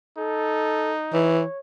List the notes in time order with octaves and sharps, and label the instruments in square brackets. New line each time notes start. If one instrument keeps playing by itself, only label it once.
[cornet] D#4 [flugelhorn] A4
[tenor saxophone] E3 [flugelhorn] C#5